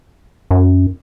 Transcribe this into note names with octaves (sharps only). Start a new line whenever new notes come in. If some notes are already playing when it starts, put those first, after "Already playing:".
F#2